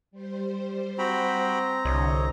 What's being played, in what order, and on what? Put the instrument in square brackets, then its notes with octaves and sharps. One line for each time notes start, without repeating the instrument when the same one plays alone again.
[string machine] G3 C5
[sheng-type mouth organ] C4 A#5 [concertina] F#4 G5 B5
[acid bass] C2 [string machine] D3 [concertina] C#5 D#5